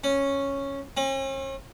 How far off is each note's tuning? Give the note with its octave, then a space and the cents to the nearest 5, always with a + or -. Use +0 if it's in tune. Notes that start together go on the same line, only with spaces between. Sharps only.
C#4 -5
C#4 -45